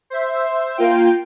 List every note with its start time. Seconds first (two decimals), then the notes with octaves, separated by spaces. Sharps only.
0.10 C5 E5
0.77 A#3 F4 G5